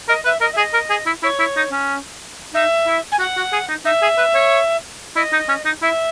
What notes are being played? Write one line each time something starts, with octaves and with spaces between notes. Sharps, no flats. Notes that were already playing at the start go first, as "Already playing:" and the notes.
A#4 D#5
B4 E5
A#4 D#5
E5
G#4 D#5
A#4
G#4
E4
E4 C#5
E4
D#4
C#4
D#4 E5
E4
G#5
F#4 F#5
F#4
G#4
D#4
D#4 E5
G#4
B4
C#5
E4 D#5
D#4
C#4
D#4
E4 E5